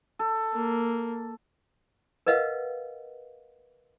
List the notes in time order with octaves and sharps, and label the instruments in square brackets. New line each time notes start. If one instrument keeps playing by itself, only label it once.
[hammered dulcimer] A4
[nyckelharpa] A#3
[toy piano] A#4 B4 D#5 F5 F#5